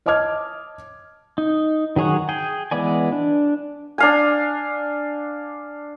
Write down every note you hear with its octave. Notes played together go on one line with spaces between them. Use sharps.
C#5 D#5 A5 D6 F6 G#6
D#4
D#3 F#3 G#4 C#5 F#5
G#4 G5
E3 G#3 B3 D5 G#5
D4
D4 F5 G#5